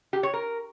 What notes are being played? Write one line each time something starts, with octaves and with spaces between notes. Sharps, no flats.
G4
C#5
A#4